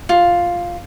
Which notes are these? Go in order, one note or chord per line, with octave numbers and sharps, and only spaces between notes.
F4